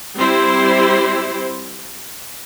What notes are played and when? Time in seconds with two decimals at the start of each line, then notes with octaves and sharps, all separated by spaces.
0.18 G3 C4 E4 G4 C5